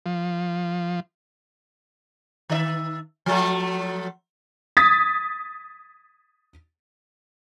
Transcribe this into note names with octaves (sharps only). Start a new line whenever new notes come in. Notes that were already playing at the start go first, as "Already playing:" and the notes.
F3
D#3 D#5 E5
F3 F#3 A3
D#6 G#6 A6 B6